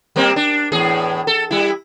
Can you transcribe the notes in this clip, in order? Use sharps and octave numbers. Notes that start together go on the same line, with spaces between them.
G3 A#3 C4
D4
E2 A2 G#4
A4
G3 E4